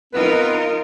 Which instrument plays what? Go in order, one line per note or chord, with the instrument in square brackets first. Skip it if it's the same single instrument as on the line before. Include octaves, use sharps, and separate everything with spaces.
[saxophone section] B3 C4 B4 [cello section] D#4 F4 A#4